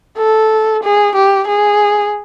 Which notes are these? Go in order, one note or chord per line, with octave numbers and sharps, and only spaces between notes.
A4
G#4
G4
G#4